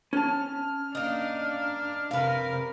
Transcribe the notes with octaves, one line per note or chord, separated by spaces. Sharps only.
C#4 A5 F6
A#3 D4 D#4
C3 A#4 B4 F5